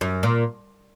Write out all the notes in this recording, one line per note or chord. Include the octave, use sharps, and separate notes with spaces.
F#2
A#2